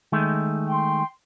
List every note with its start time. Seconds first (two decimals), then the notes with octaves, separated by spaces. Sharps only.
0.12 D#3 G#3 A3
0.69 G5 C6